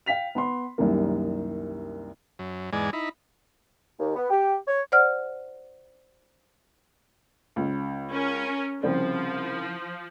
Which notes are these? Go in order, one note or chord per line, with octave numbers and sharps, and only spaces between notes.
F5 G5 B6 F7
B3 B5 C6
C2 F#2 D#3 G3 A#3
F#2
E2 G#2 G#3 D5 G#5
D#4 E4 B5
D#2
B3
G4
C#5
C5 D5 F#5 F6
C#2
C#4 A#4
C2 C#3 F3 C4